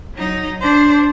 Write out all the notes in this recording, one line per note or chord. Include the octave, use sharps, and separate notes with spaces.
F#3 D#4
D4 C5